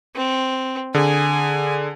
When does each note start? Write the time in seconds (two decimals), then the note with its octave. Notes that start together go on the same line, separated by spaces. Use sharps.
0.15 C4
0.94 D3 G#4 G#5